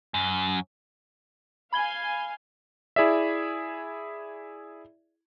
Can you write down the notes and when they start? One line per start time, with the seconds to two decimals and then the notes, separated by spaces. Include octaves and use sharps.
0.14 F#2
1.73 F5 G#5 B5 G#6 G7
2.96 E4 G#4 D5 E5